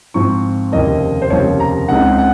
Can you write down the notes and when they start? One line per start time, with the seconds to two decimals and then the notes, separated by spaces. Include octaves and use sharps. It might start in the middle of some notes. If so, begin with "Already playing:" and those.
0.14 G#2 F3 C4 F4 C#6
0.72 F1 D#2 C#3 F3 A#3 D#5
1.22 C5
1.30 F1 D#2 C#3 F3 A#3 C#5
1.60 A#5
1.89 C#2 C#3 G#3 C4 D#4 F#5
2.18 F#5